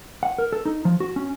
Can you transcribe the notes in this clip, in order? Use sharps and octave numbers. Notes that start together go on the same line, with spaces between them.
F#5
A#4
A4
D#4
F3
F#4
C#4